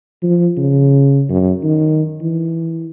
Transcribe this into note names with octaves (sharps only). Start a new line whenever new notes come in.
F3
C#3
F#2
D#3
E3